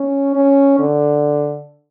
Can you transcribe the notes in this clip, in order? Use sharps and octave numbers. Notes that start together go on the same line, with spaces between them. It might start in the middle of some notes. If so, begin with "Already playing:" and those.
Already playing: C#4
C#4
D3